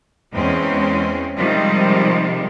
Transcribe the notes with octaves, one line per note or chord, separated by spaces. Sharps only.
E2 G#3 C4 C#4
C3 D#3 F3 G3 G#3